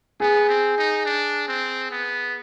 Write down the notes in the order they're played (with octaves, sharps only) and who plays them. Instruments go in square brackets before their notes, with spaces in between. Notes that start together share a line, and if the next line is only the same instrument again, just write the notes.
[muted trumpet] B3 [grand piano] G#4
[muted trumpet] C4
D#4
D4
C4
B3